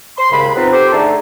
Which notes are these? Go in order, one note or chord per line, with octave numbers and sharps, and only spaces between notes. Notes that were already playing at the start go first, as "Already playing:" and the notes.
C6
D#2 G#2 C#3 B5
B3 C4 D#4 F4 B4
C4 G4 A4 C5
D3 A3 D#4 G#4 A4